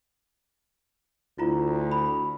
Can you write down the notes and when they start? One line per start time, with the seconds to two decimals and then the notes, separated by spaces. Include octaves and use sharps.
1.38 D2 E4 F4 A#5
1.92 B5